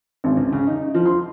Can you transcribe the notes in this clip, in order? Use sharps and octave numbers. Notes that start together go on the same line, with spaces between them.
G#1
C#2
C#3
D#4
F3
C6